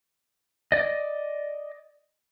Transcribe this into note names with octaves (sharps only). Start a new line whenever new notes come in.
D5 D#5